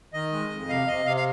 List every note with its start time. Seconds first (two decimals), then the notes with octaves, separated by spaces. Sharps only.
0.13 D#3 D#5
0.32 G#3
0.50 F2
0.69 C3 F5
0.87 C3 D#5
1.06 C3 F5
1.17 F5